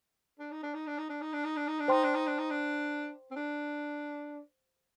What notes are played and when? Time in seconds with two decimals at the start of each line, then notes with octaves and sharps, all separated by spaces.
0.39 D4
0.52 D#4
0.63 D4
0.74 D#4
0.87 D4
0.98 D#4
1.09 D4
1.21 D#4
1.33 D4
1.45 D#4
1.56 D4
1.68 D#4
1.80 D4
1.88 D#4 C5 G5 C6
2.03 D4
2.14 D#4
2.27 D4
2.38 D#4
2.50 D4
3.31 C4
3.36 D4